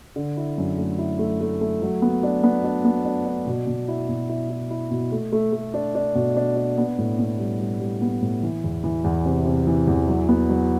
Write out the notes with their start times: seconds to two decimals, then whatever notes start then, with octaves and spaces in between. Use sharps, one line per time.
0.16 D3
0.37 E4
0.58 F#2
0.78 A3
0.99 E4
1.19 A3
1.41 A3
1.61 A3
1.82 F#3
2.02 B3
2.23 D4
2.43 B3
2.64 D4
2.85 B3
3.05 D4
3.26 D4
3.47 B2
3.67 B2
3.88 E4
4.09 B2
4.29 E4
4.50 E4
4.71 E4
4.91 B2
5.12 A3
5.32 A3
5.53 A3
5.74 D4
5.95 D4
6.15 B2
6.37 D4
6.57 D4
6.78 B3
6.98 A2
7.19 B3
7.39 G3
7.60 G3
7.80 G3
8.02 B3
8.22 A2
8.43 E3
8.64 E2
8.84 E3
9.04 E2
9.26 C3
9.46 C3
9.67 E3
9.87 E2
10.08 F#3
10.29 B3
10.49 F#3